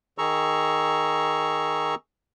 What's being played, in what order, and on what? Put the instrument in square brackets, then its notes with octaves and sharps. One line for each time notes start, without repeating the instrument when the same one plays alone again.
[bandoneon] D#3 G#4 A#5 C#6 E6